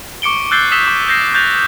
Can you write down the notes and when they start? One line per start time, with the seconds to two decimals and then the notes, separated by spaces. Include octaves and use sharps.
0.22 C#6 D6 C#7 D7 G7
0.51 E6 F#6 G6 A6 C7 G7
0.72 D#6 E6 B6 E7 G7
0.86 C#6 E7
1.08 G6 A#6 C7
1.34 F#6 G6 A6 F7